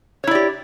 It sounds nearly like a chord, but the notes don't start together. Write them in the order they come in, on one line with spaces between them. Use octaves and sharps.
C#5 E4 D5 G4